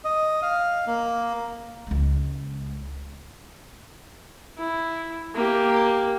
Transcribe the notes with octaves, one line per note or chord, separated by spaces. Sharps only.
D#5
F5
A#3
C#2 G#3
E4
A#3 G4